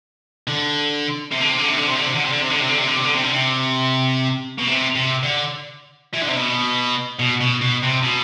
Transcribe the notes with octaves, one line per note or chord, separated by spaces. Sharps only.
D3
C3
D3
C3
D3
C3
D3
C3
D3
C3
D3
C3
D3
C3
D3
C3
D3
C3
D3
C3
D3
C3
D3
C3
B2
C3
C3
D3
E3
D3
C3
B2
B2
B2
B2
C3
B2